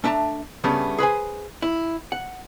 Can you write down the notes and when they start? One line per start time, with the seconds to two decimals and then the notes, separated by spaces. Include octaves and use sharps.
0.04 A3 D4 E5 A5 A#5
0.64 C#3 G3 A3 B3 C#4 D4
0.99 G#4 B4 C5 G#5
1.62 E4
2.12 F#5